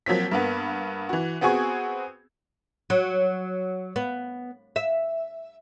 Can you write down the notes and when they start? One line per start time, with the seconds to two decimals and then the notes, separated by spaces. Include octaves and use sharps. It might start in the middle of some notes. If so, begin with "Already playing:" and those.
0.06 F3 F#3 A#3 C4 B6
0.31 G2 A#3 B3
1.09 E3 F#4
1.41 B3 C4 F#4 G#4 C#6 G#6
2.90 F#3
3.96 B3
4.76 E5